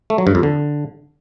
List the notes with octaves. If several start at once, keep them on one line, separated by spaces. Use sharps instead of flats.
A3
F#3
G2
F2
D3